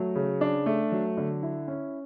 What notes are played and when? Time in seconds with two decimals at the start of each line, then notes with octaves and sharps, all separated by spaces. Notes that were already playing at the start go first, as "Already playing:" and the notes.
Already playing: F#3 A3
0.15 C#3
0.41 D4
0.66 A3
0.92 F#3
1.17 D3
1.42 E4
1.68 C#4